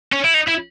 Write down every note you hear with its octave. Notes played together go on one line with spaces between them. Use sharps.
C#4
E4
D#4
E4